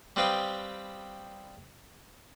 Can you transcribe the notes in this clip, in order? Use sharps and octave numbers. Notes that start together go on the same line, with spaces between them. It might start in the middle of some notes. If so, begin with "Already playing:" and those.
G3 C4 B4 F5 G5 D#6